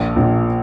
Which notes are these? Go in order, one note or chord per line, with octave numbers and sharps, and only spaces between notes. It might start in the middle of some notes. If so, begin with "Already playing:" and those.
Already playing: A#1 A#2
A#1 A#2